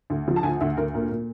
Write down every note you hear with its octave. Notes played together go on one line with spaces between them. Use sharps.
D2
F3
A5
D2 G#5
D2 E5
D2 A#4
A#2 A#4
A#2